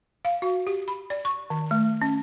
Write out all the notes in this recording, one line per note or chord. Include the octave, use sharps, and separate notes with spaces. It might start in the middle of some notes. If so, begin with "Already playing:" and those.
F5
F#4
G4
B5
D5
C#6
D#3
A3
C#4